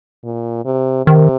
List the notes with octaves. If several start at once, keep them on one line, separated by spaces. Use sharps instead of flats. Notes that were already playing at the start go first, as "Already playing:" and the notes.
A#2
C3
C3 D#3